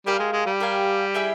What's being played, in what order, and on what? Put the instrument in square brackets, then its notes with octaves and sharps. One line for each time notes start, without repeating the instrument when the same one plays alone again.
[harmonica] G3 [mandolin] G4 A#4 F5 G#5
[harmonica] G#3
G#3
G3
[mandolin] G4 A#4 F5 G#5
E4 G#4 E5 G5